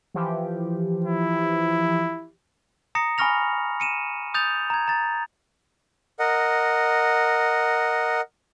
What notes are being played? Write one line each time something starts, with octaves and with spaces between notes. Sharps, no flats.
E3 F3 G4
E4
A#5 D#6 A#6 C#7
G#5 B5 C#6 F6 A#6 F7
C#7 D#7 E7
D#6 G6 A6 F7
A#5 G#6
A#5 A6
A#4 D#5 F#5